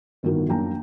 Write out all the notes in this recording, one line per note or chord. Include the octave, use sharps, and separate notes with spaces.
G1 A2 D#3 B3 F#4 A#4
F#2 A#3 D4 G5 G#5 A#5